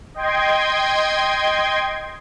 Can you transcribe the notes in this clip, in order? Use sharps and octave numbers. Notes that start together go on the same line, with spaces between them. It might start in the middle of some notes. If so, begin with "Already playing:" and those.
D#5 G5 C6 G#6